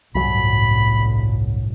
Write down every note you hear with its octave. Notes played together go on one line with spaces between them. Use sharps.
G1 C2 A2 F#3 B5